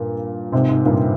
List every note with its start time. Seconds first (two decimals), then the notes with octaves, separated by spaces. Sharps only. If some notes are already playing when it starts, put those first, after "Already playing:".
Already playing: G2 A#2
0.52 G#2 C3
0.69 G#2
0.86 G2 A#2